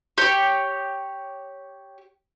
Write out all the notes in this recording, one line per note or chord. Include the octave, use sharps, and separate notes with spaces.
G4 C#5